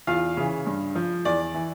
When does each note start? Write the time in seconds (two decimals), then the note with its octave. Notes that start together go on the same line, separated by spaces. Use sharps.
0.07 E2 F4 F5
0.37 C#3 E3
0.66 G2
0.96 F3
1.25 E2 D5
1.54 E3